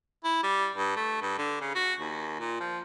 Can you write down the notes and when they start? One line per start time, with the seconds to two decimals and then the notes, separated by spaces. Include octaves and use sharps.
0.24 E4
0.43 G3
0.76 G2
0.96 A3
1.22 G2
1.38 D3
1.61 C#3
1.75 F#4
1.99 D#2
2.39 A#2
2.60 F3